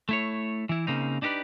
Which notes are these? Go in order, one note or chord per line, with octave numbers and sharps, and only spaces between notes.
A3 E4 C#5
E3 E4
C#3 A#3 C4 D#4
D4 D#4 G4 A4 B4 D5